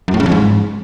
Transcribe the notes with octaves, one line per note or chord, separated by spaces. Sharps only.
F#2
A2
C#3
F2
G#2